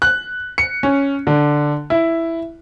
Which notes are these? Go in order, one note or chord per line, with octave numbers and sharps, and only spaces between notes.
F#6
C#7
C#4
D3
E4